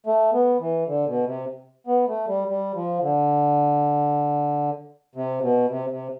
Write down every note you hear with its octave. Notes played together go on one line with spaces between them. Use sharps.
A3
B3
E3
D3
B2
C3
B3
A3
G3
G3
F3
D3
C3
B2
C3
C3